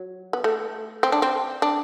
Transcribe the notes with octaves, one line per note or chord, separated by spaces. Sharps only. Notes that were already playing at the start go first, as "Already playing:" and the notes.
Already playing: F#3
B3
A3
C4
D4
C4
D4